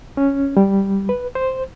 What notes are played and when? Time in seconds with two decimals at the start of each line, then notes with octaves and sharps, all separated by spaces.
0.17 C#4
0.57 G3
1.09 B4
1.35 C5